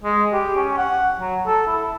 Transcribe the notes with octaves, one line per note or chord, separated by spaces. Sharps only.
G#3
G4
C#4
F#5
F#3
A4
E4